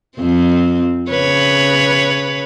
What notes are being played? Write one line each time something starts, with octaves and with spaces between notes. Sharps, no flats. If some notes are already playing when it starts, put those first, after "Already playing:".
F2 C4
C#3 B4 C#5